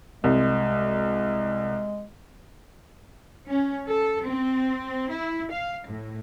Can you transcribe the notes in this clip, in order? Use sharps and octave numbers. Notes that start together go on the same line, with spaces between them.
C2 G#3
C#4
A4
C4
E4
F5
A2